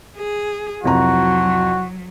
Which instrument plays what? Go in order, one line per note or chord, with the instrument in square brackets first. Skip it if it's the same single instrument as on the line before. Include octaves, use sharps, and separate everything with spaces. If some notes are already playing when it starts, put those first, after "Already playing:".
[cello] G#4
[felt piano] C2 F2 A#5 [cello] F#3 [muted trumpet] F#4